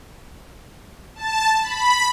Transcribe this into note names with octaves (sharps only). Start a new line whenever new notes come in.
A5
B5